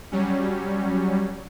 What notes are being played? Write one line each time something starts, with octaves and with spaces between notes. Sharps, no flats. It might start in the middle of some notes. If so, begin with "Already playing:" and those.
F#3 G3 C#4